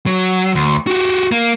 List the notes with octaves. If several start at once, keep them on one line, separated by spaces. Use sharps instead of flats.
F#3
D2
F#4 G4
A#3